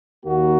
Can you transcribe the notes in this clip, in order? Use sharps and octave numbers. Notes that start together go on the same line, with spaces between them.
D#2 D#3 A#3 F#4